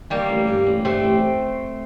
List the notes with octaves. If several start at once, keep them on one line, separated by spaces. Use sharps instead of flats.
D#3 G3 A#3
A1
G2
A1
G2 A3 C4
A1